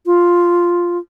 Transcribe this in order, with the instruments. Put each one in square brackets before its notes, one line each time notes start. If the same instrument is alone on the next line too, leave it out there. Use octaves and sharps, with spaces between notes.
[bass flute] F4